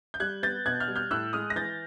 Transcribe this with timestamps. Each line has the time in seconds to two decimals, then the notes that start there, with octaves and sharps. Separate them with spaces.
0.14 G6
0.20 G3 F#6 G#6
0.43 B3 G6 A6
0.66 B2 F#6 G#6
0.80 F6 G6
0.88 G3
0.96 F6 G6
1.11 A2 E6 F#6
1.33 G#3 D#6 F6
1.50 A#6
1.56 E3 G6 A6